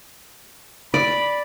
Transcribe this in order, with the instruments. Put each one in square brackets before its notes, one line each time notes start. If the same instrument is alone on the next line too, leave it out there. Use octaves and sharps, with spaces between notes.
[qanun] D5 [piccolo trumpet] B5